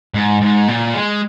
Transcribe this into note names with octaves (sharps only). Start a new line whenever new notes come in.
G#2
G#2
A#2
G#3